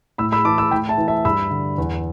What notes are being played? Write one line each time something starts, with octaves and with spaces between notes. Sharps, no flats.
A2 B5 E6
B5 E6
E3 A5 D6
B5 E6
A2 G5 B5
E5 A5
E3
E5 A5
G2 B5 E6
D3
E2